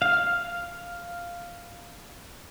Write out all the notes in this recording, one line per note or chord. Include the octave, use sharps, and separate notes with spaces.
F5 F6